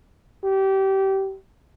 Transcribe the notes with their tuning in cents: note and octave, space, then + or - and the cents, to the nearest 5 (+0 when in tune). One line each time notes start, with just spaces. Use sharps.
G4 -25